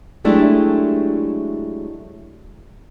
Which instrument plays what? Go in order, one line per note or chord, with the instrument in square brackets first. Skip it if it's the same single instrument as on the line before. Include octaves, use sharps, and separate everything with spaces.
[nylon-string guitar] F#3 G#3 A3 D4 E4 G4